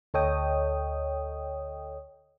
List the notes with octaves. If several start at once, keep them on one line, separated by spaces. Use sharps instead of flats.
D2 A4 C#5 D#5 G5 D#6